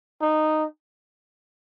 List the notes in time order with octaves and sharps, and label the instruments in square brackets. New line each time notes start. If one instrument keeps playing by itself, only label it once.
[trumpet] D#4